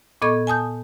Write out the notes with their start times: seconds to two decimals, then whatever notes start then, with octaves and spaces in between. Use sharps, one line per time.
0.22 A#2 B3 A4 D#5 C#6 G#6
0.47 G#5 A5 D#6 G6